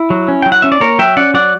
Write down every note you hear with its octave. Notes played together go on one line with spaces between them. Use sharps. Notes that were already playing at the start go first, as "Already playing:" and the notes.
Already playing: E4
F#3
C#4
F#3 G5
F#5
C#4 E5
D5
A#3 A#4 C#5
F#3 E5 G5
C#4 D5 F#5
F#3 D5 F#5